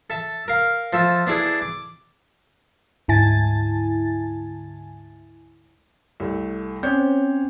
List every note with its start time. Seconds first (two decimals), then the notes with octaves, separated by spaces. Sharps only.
0.10 A4 E5 A5
0.48 A#4 F5
0.93 F3 A4 E5
1.27 B3 D4 E4 G#4 A4
1.62 D6
3.08 D2 G#2 E4 G#5 A5 A6
6.20 C2 A3
6.83 C4 C#4 C5 C#5 G6